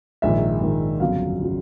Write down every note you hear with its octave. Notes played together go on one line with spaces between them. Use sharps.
A#1 G#2 D#3 E5
A#1 G#2 D#3
G1 F2 C#3 F#3 F5
C#3 F#3